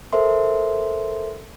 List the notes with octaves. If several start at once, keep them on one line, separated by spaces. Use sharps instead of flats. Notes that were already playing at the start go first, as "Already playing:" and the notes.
A4 A#4 C5 E5 C6